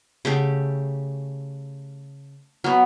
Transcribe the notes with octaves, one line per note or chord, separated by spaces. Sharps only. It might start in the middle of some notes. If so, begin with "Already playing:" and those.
C#3 A3 G4
F#3 B3